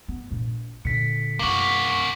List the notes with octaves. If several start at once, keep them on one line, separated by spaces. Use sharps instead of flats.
B3
A#1 A#2
A#2 D3 B6 C#7
B1 F#2 A#3 F#4 D6
C#6 B6